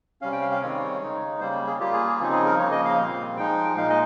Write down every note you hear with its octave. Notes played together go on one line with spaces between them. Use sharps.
C3 G3 C#4 F5
G5
F5
F5
D#3 G#3 C4 C#5
C#3 G#3 D#4
C#3 G3 A#3 C5
G#4
G3 A#3 F4 G4
G#4
G#4
C#3 F3 C4 D#4 G#4
G#4
A#4
C#3 F3 A#3 C#5
D#5
F5
A#2 G3 C4
F3 G#3 D#4 G5
A#2 G#3 D#4 F5
D#5